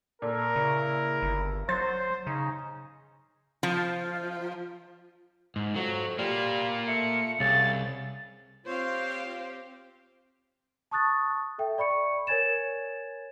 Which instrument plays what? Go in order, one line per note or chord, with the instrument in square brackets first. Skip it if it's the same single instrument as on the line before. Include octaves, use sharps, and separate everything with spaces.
[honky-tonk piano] A#2 [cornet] A4 [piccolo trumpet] A#4
[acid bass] C#3 [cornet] E4
[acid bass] G1
[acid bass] F#3 [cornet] C5 [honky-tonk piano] A6
[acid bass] C#3 [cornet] D#4
[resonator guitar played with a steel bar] F3
[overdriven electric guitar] G#2
[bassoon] F2 [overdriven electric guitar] F#3
[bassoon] G3 [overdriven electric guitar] A#3 F4
[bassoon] A3 [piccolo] C#7
[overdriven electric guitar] C2 [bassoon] C#3 [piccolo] A6
[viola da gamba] C4 G4 [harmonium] F4 C#5 [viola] C5 F5
[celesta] A5 C#6 D#6 F#6 A6
A4 E5 G5
D5 B5 C#6 C#7
A#4 C#5 G#5 G#6 A6 E7